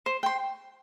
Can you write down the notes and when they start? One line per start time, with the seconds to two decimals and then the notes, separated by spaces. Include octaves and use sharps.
0.06 C5
0.23 G5 C6